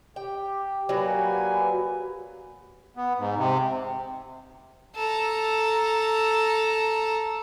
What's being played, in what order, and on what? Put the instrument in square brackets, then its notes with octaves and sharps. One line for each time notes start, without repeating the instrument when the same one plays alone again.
[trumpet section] G4 [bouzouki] G5
[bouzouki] F#3 G3 F#4 [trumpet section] A#3 B4 G#5
[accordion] B3
G#2
C3
[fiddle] A4 A#5